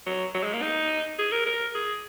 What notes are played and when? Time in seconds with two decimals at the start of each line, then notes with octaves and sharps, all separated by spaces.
0.06 F#3
0.35 F#3
0.43 G#3
0.53 A#3
0.62 D#4
1.19 G#4
1.32 A#4
1.46 A#4
1.75 G#4